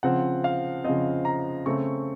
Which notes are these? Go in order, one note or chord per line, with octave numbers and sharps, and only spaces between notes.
C#3 F3 C4 F#5
F5
C#3 F3 C4 D#5
A#5
C#3 A3 C4 C#6